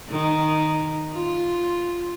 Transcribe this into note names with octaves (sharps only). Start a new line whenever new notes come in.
D#3
F4